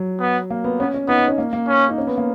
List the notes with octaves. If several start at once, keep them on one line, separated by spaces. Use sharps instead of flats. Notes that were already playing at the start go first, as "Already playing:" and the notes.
Already playing: F#3
B3
A#3
B3
B3 C#4
C#4
B3 D#4
D#4
C#4
A#3
A#3
C#4
D#4
C#4
B3
A#3